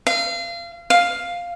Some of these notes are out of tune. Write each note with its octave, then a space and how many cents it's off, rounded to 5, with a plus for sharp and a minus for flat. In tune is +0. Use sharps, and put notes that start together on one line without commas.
F5 -30
F5 +5